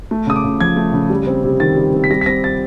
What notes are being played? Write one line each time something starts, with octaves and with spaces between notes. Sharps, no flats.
A3
C#3 D#6
D6
C#3
F3 G#6
A3
C#3
G3
C4
C3
D#3 A6
G3
C4
B6
G3 A#6
B6
C4 A#6
A6